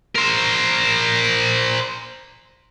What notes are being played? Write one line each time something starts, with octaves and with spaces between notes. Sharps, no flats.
A#4 C5